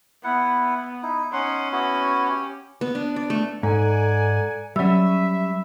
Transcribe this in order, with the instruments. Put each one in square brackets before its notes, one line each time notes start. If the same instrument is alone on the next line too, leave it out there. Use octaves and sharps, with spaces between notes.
[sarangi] B3 [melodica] E4 F#5
[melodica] D#4 E4
[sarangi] C#4 [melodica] D#4 F#5 C6
[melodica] B3 E4 F#4
G4
[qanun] B3
D4
D5
A3
[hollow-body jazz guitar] G#2 [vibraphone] A4 A#5 [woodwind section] D5 F#5 G#5
[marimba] F#3 E6 [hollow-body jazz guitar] G3 C#4 [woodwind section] E5 [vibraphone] B5